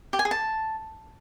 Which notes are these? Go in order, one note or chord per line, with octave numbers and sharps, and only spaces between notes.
G4
G#5
G#4
A5